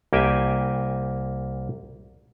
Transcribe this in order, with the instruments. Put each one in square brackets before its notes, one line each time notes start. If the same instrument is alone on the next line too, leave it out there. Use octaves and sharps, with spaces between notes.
[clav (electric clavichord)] C2 A#3 G4 E5 G5 G#5